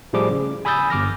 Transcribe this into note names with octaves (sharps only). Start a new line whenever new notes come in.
A2 F3 G3 A3 G#4 D6
C#3
G#5 B5 D#6 E6 G6 A6
G1 D6 F6 A#6